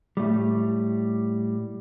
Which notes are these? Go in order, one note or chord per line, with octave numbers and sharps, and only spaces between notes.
A2 G3